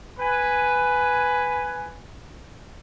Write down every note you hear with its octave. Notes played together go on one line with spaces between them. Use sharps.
B4 G#5